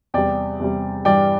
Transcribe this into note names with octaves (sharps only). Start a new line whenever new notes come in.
E2 C3 G3 D5 G5
E2 C3 G3
G2 E3 G3 D5 G5